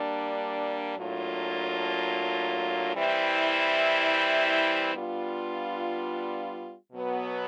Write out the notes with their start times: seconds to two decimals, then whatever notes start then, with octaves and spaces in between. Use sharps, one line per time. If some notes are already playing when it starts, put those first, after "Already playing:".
Already playing: G3 A#3 D4
0.97 A2 F#3 A#3 D4 F4
2.95 E3 G3 C4 E4
4.95 G3 B3 D4 F4
6.93 B2 F#3 B3